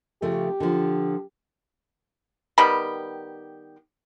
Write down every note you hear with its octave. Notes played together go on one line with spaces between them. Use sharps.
C#3 F3 A3 G4
D3 F3
D#3 G3 B3 G4